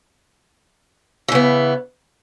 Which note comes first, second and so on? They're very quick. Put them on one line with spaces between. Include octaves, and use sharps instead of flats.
E3 C#3 B3